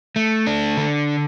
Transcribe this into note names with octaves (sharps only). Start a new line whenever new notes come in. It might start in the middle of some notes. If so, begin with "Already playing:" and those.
A3
D4
D3